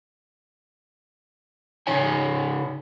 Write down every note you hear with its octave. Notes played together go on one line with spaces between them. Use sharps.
C#3 D#4 C#5 G#5